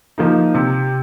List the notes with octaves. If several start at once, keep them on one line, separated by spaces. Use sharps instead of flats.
F3 A#3 D#4
C3